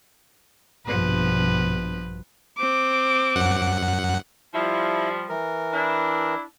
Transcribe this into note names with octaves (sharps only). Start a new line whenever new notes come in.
A#1 G2 B2 F3 B4
C4 D6
F#2 F#5
F3 G3 E4
E3 A#4
D4 E4